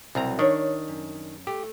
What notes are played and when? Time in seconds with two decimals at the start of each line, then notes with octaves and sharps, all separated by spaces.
0.15 C2 B2 F#3 C4 A#5
0.39 D#3 D4 C#5
0.88 F#2
1.47 A3 G4